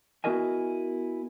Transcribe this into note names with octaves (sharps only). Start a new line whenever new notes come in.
B3 E4 F#4 A#4 D#5 G#5